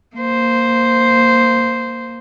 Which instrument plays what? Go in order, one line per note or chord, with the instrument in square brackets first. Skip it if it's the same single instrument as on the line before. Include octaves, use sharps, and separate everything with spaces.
[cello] A#3 C5